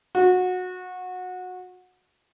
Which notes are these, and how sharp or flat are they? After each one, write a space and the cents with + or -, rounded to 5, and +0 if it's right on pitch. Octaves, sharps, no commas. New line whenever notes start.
F#4 -20